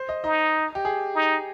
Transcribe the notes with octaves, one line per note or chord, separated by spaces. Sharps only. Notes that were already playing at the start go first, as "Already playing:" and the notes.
Already playing: C5
D#5
D#4 D#5
G4
G#4
D#4